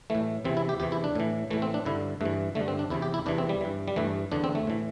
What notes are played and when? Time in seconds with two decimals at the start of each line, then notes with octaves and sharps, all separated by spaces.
0.10 A2 E3 A3
0.44 E2 C3 E3 C4
0.57 E4
0.69 G4
0.80 E2 C3 E3 G4
0.92 E4
1.04 D4
1.15 A2 E3
1.51 A2 E3 A3
1.62 C4
1.74 D4
1.85 G2 D3 E4
2.21 G2 A3
2.25 E3
2.55 G2 D3 A3
2.68 C4
2.79 D4
2.90 E2 C3 E3 E4
3.02 G4
3.14 E4
3.26 E2 C3 E3 D4
3.38 C4
3.49 G3
3.61 G2 E3
3.88 G3
3.96 G2 E3 A3
4.32 E2 D3 D4
4.44 C4
4.55 A3
4.67 A2 E3